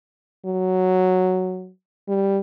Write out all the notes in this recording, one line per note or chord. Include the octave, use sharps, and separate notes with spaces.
F#3
G3